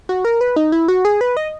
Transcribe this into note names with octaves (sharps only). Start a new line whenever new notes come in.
F#4
A#4
B4
D#4
E4
F#4
G#4
B4
D#5